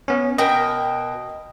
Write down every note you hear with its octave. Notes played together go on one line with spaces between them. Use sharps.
B3 C#4
B2 A#4 D#5 G5